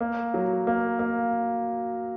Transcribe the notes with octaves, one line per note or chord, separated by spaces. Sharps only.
A#3
F#3
A#3
A#3